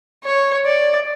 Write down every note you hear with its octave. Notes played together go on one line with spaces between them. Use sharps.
C#5
D5